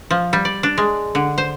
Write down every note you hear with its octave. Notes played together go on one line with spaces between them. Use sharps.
F3
G3
D5
D4
G#3
D3
C5